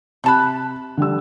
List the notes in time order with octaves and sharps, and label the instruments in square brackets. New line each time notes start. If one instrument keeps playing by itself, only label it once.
[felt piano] C3 F#6 [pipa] A3 A5 B5
[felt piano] D3 G3 E6